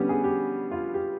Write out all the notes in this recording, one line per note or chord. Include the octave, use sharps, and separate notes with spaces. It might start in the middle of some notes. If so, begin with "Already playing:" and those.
Already playing: D3 G3 B3 C#4 G4
G#4
G4
F4
G4